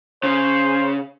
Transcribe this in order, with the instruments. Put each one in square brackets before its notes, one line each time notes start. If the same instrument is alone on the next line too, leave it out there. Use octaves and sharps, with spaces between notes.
[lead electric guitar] C#3 [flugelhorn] C5